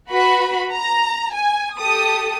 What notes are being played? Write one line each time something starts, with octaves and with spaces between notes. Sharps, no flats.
F#4 B4 B5
A#5
G#5
G4 A4 D#6